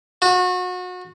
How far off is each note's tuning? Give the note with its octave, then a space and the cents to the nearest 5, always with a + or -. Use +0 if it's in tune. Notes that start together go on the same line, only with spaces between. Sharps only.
F#4 -30